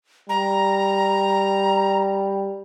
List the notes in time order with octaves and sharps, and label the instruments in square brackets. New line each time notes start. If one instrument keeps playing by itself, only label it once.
[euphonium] G3 [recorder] A#5